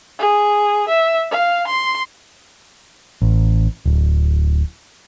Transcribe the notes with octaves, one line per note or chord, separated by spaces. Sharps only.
G#4
E5
F5
C6
A1
D1